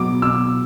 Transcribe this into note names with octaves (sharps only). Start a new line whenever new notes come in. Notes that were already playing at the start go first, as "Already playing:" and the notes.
Already playing: B2 F#3 D6
B2 E6